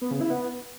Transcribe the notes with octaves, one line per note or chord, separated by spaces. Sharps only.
B3
C#3
E4
B3